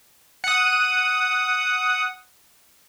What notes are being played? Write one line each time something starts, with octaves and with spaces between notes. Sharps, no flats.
F#5 D#6